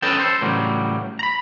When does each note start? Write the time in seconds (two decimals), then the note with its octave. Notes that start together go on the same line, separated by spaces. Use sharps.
0.02 C#4 A4 B4 D#5 G5 A5
0.19 A4 C5
0.41 A2 C#3 E3 F#3 G3
1.19 A#5 B5